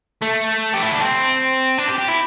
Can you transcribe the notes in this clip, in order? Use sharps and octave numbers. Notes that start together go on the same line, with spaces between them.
A3
G4
E4
D4
C4
D4
G4
G4
E4